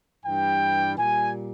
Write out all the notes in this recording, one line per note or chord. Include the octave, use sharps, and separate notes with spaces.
G2 E3 G3 G5
A#2 G3 G#5